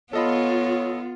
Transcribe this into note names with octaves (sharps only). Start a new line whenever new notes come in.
B3 F4 A4 C#5 D#5 B5